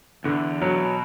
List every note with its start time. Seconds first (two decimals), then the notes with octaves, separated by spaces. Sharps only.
0.24 E2 D3
0.61 B2 F#3